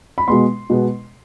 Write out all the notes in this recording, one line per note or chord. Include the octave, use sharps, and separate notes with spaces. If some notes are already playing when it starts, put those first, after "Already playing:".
B5
B2 G#3 B3 C6
B2 G#3 B3